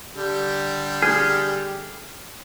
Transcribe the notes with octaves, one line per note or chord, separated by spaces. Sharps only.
D3 G3 G4
G#4 F6